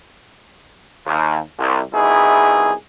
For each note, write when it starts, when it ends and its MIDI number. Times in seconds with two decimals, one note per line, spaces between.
1.06 1.37 39
1.58 1.80 36
1.92 2.71 36
1.92 2.71 47
1.92 2.71 63
1.92 2.71 64
1.92 2.71 68